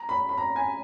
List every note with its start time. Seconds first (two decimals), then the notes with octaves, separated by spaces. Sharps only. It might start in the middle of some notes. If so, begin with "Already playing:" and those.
Already playing: A#5
0.09 B5
0.29 B5
0.38 A#5
0.56 G#5